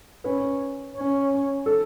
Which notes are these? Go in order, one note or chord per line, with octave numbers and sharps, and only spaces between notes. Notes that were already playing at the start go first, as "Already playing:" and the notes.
C#4 B4
C#4
A4